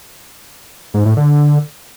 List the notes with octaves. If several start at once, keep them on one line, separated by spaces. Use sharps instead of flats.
G#2
A2
D3